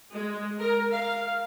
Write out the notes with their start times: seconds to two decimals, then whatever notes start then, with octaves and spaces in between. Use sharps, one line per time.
0.12 G#3
0.59 A#4
0.92 F5